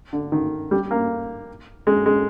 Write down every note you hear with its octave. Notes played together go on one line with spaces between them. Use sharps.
D3
D#3
G3
A#3
G#3
G#3